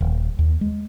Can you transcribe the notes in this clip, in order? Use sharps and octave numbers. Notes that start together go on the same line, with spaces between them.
D#1
D#2
G#3